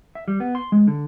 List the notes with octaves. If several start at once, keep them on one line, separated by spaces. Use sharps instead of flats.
E5
G3
B3
C6
G#3
D3